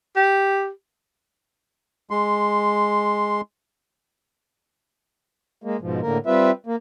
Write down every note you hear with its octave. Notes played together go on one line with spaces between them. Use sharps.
G4
G#3 C6
G#3 A#3
G#2 B2 F3
A2 D3 A#3 A#4
G3 C4 F4 B4 E5
A#3